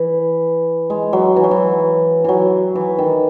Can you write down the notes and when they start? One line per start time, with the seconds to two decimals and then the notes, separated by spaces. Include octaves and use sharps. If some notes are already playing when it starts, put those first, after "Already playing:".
Already playing: E3
0.90 G#3
1.13 F#3
1.36 E3
1.44 F#3
1.51 E3
2.24 E3 F#3
2.75 E3
2.98 D#3